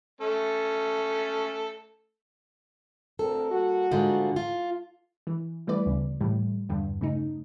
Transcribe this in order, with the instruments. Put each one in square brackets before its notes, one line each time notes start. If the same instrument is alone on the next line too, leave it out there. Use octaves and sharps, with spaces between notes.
[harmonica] A3 C#4 A4
[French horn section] D2 C4 A#4 [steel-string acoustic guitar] A4
[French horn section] G3 A#3 F#4
[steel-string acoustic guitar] G#2 D3 F4
F4
[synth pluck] E3
E3 G3 A3 B3 B4 D5
D2 C#3
A2 E3 G3
E2 G2 D3
C#3 A3 D#4